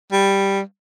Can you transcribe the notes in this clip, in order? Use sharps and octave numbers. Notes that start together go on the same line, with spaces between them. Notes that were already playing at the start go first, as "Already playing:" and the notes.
G3